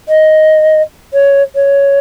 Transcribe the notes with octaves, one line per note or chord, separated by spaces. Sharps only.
D#5
C#5
C#5